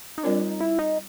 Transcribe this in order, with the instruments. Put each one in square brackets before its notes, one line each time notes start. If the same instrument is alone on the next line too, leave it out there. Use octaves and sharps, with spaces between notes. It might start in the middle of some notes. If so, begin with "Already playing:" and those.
[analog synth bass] D#4
[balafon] G3 C4 F4 A#4 C#5 [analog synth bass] D4
[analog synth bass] D#4
E4
D#4